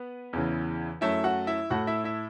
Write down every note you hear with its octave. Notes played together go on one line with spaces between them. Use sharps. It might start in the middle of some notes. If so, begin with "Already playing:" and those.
Already playing: B3 B4
E2 C#3 E3
F#2 F#3 A3 E4 E5
F#4 F#5
E4 E5
A2 A3 F#4 F#5
E4 E5
E4 E5